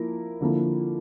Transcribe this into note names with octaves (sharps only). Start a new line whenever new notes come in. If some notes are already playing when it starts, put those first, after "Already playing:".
Already playing: F3 A#3 E4 A#4
D3 F3 A#3 E4